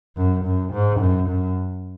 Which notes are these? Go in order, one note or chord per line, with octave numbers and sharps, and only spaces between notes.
F#2
F#2
G#2
F#2
F#2